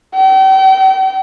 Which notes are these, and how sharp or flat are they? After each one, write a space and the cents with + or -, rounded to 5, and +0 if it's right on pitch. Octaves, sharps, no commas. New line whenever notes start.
G5 -40